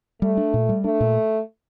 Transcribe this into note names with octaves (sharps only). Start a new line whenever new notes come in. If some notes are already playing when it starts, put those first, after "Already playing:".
G3 A3
D4
A#2
G3
A3 D4
A#2